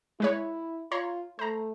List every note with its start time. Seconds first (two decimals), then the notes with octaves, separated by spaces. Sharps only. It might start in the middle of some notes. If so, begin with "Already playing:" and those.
0.20 G#3 E4 B4 C#5
0.92 F4 C#5 A#5 C6
1.39 A3 C5 A#5